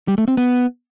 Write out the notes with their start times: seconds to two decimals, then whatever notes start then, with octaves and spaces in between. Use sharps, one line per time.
0.08 G3
0.18 A3
0.28 C4
0.37 B3